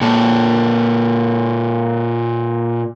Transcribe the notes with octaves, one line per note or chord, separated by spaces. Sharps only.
A#2 A4